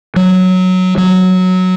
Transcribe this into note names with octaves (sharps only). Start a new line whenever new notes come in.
F#3
F#3